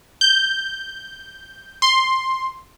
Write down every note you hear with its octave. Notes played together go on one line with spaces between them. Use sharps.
G6
C6